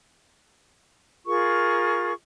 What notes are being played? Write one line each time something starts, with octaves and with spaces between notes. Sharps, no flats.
F4 G#4 A#4 C#6